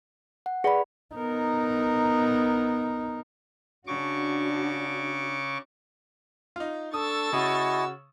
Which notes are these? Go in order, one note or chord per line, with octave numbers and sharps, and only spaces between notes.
F#5
G#4 B4 D5 F#5 B5
B3 D#4 A#4
C#3 D4 F#4 C#6 D6
D#4 F4
D4 A4 C#6 D#6 E6 A6
C#3 E4 F#4 D#5 G#5